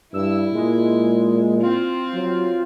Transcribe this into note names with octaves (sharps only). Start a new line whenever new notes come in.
G2 E4 E6
A#2 G#3
C4 F4
F#3